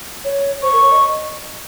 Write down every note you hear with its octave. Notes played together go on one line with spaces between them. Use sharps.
C#5
C5 C#6
A#4
C#5
D#5